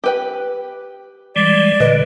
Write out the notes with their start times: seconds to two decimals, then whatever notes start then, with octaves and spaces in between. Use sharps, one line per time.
0.04 G4 B4 G5
1.36 E3 G3 G#3 D5
1.80 A#2 D3 B4 D#5